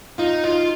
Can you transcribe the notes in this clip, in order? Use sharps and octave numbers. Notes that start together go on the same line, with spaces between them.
D#4 F4
D#4 F4